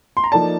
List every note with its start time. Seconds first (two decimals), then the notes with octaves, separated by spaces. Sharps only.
0.17 C6
0.24 A#5
0.32 F3 A#3 D#4 A4 D5 A5